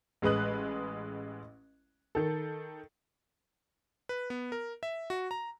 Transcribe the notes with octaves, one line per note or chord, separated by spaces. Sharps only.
A1 G#3 B4 D#6 F#6
D#3 A4
B4
B3
A#4
E5
F#4
A#5